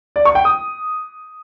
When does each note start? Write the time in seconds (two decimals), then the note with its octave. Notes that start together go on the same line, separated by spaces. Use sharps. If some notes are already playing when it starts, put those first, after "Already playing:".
0.16 D5
0.25 C#6
0.35 G5
0.45 D#6